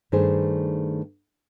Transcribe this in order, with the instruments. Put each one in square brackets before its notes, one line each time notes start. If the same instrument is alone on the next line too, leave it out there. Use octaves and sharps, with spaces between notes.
[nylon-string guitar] G2 D#3 A3 G#4 C5